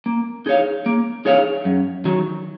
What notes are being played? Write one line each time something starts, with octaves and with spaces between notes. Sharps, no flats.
A#3
D#4 G#4 C#5 F5
A#3
D#4 G#4 C#5 F5
F#2
D#3 F#3